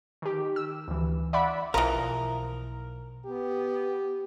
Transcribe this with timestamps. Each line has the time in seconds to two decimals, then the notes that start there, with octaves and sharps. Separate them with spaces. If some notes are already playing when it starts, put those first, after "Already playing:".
0.22 D#3 G4
0.56 E6
0.88 D2 E3
1.33 D5 E5 F#5 B5
1.74 B1 E3 F3 A#4 A#5 D#6
3.26 B3 G4